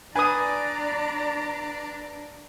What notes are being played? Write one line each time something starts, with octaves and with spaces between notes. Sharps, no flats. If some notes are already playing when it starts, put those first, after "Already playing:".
D4 B4 D5 G#5 A#5 D#6